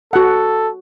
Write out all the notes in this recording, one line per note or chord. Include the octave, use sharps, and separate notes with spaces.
F#4 A4 F#5